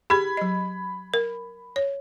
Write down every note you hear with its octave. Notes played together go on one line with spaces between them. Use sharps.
G4 G#4 B5 G#6
F#3 D#5
A#4
C#5